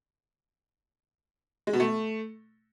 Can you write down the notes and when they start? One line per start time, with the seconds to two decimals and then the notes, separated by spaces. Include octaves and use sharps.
1.67 G#3
1.73 B2
1.80 A3